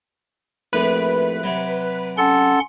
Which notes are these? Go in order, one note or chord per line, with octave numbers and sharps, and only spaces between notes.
A#1 A2 C3 B4
C3 F#3
C#4 A4 F#5 C6